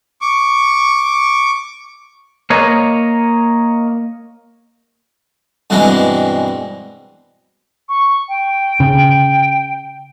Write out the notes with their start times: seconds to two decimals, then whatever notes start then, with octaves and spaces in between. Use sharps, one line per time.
0.21 C#6 D6
2.50 A#3 C#5 D#5
5.70 G2 B2 E3 G#3 C4
7.89 C#6
8.29 G5
8.80 C#3